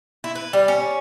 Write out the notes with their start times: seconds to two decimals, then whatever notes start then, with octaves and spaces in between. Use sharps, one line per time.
0.24 E4
0.35 B4
0.53 G3
0.68 C#4